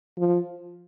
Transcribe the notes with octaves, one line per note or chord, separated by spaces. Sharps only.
F3